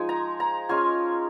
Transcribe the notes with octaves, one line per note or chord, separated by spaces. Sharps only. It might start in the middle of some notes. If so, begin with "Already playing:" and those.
Already playing: F3 G#3 D#4 G#5
A#5
A#5
G#3 C#4 F4 G#5